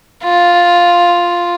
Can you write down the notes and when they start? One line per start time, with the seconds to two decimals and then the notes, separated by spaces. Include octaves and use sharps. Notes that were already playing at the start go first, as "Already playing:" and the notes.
0.24 F4